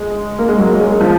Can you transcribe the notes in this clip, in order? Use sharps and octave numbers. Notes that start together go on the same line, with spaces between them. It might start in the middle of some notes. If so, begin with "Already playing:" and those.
Already playing: G#3
A#3
G#3
F#3
A#3
G#3
G#3
F3